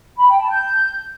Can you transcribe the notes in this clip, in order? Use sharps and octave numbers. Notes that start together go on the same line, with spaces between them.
B5
G5
A5
G6